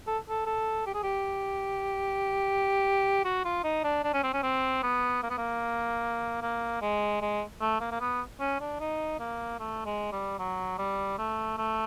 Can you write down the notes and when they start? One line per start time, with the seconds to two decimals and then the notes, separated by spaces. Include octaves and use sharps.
0.07 A4
0.29 A4
0.46 A4
0.86 G4
0.94 G#4
1.03 G4
3.24 F#4
3.44 F4
3.64 D#4
3.84 D4
4.04 D4
4.14 C#4
4.23 C4
4.33 C#4
4.43 C4
4.83 B3
5.23 A#3
5.30 B3
5.38 A#3
6.42 A#3
6.81 G#3
7.21 G#3
7.61 A3
7.80 A#3
7.91 A#3
8.00 B3
8.40 C#4
8.60 D4
8.80 D#4
9.19 A#3
9.59 A3
9.85 G#3
10.12 G3
10.39 F#3
10.78 G3
11.18 A3
11.57 A3